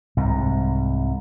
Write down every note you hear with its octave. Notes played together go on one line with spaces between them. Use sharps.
C2 G#2